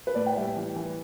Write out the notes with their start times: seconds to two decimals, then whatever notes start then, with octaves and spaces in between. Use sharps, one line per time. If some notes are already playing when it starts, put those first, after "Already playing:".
0.07 B4
0.15 A2 D5
0.26 G5
0.36 G3 E5
0.56 E3
0.76 E3